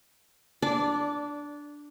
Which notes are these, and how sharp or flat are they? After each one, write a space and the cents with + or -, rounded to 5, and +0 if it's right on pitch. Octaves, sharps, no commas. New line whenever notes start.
D4 +0 D5 -20